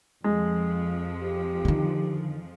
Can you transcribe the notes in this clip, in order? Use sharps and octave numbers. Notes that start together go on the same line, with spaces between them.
F2 F3 G#3
G4
D3 D#3